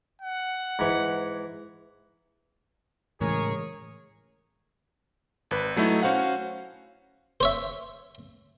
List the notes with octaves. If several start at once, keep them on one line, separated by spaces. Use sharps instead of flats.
F#5
G#2 E3
A2 C#3 E3 G#3 G#4 A#4 C#5
G#1 B4
F#3 A3 D#4 E4
C#4 F#4 C5 F5 F#5
C5 C#5 E5